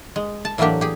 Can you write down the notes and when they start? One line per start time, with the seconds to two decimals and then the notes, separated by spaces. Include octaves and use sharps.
0.16 G#3
0.45 A5
0.58 A2 E3 F#3 A#3 D4 G4
0.81 G4 G#4